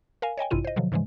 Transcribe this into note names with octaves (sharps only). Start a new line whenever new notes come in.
A#4 F5 G#5
C#5 D#5 G5 G#5
A1 G2 C3 E4 F4 D#7
C5 D#5
B2 D3 F3 F#3
G#2 C#3 E3 F3 G#3